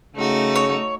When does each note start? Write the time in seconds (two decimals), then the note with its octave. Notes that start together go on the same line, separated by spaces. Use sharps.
0.16 C#3 A3 D#4 F#4
0.56 C#5